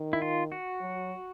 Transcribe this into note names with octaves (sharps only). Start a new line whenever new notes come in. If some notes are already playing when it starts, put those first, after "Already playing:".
Already playing: D#3
E4
F4
F#4
F#3